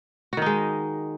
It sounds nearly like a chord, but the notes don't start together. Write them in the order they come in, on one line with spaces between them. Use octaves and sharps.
F#4 D#3 D#4 G#3